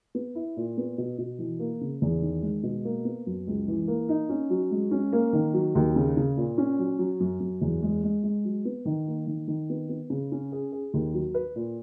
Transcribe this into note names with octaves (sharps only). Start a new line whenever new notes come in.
B3
E4
A#2
B3
B2
B2
E3
A#3
C#3
E2
D#3
G#3
B2
A#3
B3
F#2
C#2
E3
A#3
D#4
C#4
F#3
G#3
C#4
A#3
D#3
F#3
D#2
C#3
C#3
A#2
C#4
F#3
F#3
F#2
F#2
E2
G#3
G#3
G#3
F#3
B3
D#3
A#3
D#3
D#3
B3
B3
C#3
C#4
G#4
G#4
D#2
F#3
B4
A#2